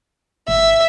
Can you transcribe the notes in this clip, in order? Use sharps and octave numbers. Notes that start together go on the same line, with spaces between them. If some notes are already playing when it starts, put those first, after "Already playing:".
G#1 E5